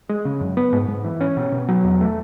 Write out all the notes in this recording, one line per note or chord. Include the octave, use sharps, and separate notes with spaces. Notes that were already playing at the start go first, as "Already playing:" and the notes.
G#3
C#3
F#2
B3
G#2
G#2
E3
C#4
B2
B2
F#3
E2
A3